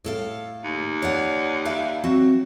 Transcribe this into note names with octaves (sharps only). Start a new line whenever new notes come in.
A2 A4 F5
D#2
C#5 D5 F#5
D5 E5 F5
F#3 C4 F#4